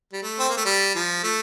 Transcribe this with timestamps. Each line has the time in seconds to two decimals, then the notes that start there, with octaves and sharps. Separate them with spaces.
0.13 G3
0.23 A3
0.39 C4
0.49 A#3
0.57 A3
0.66 G3
0.95 F3
1.24 A3